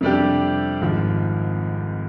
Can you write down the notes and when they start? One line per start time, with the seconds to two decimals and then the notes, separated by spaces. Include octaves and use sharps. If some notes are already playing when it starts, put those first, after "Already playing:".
0.01 F2 C3 G3 D4 G4
0.81 G#1 G#2 F3